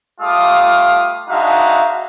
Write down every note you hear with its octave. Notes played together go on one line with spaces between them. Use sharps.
G3 A3 F4 F5 D6 D#6
G#3 D4 D#4 F#4 E5 F5